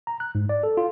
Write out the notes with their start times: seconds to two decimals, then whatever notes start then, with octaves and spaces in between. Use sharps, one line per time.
0.07 A#5
0.20 F#6
0.35 G#2
0.49 D5
0.63 A4
0.77 F4